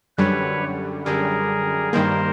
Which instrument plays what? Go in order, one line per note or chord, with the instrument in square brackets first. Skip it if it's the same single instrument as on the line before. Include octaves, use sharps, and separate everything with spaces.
[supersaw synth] F#2 D3 G3 [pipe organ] B4 C#5
[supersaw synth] F#2 D3 G3 [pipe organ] G#4 A#4
[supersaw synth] G2 D#3 G3 A#3 [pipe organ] A#4 C5